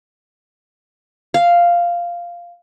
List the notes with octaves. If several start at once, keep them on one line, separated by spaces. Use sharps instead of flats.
F5